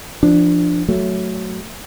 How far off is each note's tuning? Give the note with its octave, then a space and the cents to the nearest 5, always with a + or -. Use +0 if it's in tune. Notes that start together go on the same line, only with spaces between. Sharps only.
F3 -15 D4 +10
F#3 +5 A3 +0